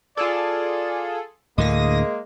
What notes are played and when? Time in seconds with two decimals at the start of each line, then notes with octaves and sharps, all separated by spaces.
0.17 F4 G#4 A4 D5
1.58 D2 A2 D3 G#3 A#3 D#6 A#6